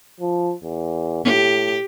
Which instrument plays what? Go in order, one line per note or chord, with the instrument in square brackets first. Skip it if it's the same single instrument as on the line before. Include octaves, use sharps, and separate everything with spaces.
[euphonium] F3
E2
[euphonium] A2 [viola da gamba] G4